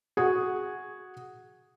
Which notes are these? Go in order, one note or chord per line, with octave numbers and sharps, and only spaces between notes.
F#4 G#4